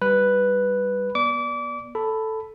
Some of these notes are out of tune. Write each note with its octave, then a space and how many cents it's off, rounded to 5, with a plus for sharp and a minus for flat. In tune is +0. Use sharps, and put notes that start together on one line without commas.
G3 +0 B4 +0
B3 -30 D5 -5 D6 -30
A4 +0 B5 +5